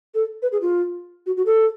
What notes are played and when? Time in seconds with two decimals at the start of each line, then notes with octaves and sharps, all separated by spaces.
0.15 A4
0.42 B4
0.52 G#4
0.61 F4
1.26 F#4
1.37 F#4
1.46 A4